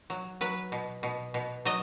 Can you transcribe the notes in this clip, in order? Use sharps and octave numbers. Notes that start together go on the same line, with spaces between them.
F#3
F#3 B4
B2
B2
B2
F#3 D#5